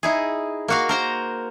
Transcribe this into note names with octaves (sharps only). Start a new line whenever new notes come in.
D#4 E4 G#4
A#3 F#4 F5
A#4 C5 A#5